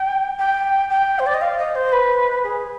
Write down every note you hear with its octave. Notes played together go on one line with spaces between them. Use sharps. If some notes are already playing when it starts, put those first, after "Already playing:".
Already playing: G5
G5
G5
C5
D5
D#5
F5
D#5
C5
B4
G#4